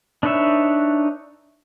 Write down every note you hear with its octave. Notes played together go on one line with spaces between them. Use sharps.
D4 D#4 B4 C#5 E5